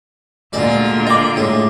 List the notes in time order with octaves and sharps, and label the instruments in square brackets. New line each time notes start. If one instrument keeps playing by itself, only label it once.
[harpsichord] D2 G#3 D5 [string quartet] A#2 D3 F4
[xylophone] D#5 D6 [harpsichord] G5 B5
[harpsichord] A2 G#3